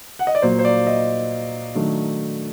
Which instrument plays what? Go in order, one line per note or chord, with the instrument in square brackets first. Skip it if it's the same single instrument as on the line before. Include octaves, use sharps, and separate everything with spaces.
[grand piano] F#5
D#5
D5
A#2 F#3 A#3 C5
C5
D5
D#5
D#3 F#3 A3 D4